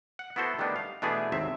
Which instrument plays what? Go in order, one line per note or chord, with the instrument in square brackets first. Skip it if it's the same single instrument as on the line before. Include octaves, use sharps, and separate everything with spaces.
[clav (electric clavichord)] F#5
B3 E4 F#4 A4 C5
D#3 G3 A3 B3 D4 D#4
F5
B2 E3 A3 B3 D4 G#4
G#1 D#2 C3 C4 E5